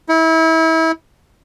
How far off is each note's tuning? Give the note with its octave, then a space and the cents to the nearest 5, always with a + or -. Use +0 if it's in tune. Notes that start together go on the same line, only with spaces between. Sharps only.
E4 -30